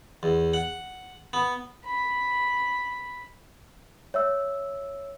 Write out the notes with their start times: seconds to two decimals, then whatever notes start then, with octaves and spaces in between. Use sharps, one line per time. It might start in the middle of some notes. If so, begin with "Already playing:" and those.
0.23 E2
0.54 F#5
1.33 B3
1.85 B5
4.14 C#5 E5 E6